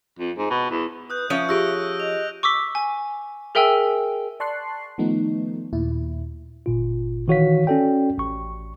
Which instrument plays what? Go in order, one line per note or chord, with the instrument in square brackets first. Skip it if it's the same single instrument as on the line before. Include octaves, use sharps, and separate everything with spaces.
[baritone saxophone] F2
G#2
B2
E2
[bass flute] B4 [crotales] D#6 F#6 G6
[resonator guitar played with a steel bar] F3 C#4 C#5 [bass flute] E5 [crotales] G6 D#7
[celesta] F4 G4 G#4 [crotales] E6 A#6 D7
[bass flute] D#5 [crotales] F7
[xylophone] C#6 D6 E6 B6 G7
G#5
G#4 A#4 E5 G5 G#5 E6
[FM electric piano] D5 A5 C6 C#6 F#6 C7
D#3 F3 A3 B3 D#4
D#2 A#2 E4
[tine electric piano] G1 A#2 F4
D#3 E3 F#4 C#5 F5 B6
C#4 F#4 A4 D5 G5
A1 C#6